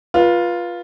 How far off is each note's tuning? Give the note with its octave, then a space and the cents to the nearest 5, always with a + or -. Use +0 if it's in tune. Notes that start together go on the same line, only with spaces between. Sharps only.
F4 +0 B4 -25